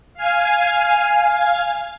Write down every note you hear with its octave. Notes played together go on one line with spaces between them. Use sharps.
F5 G#5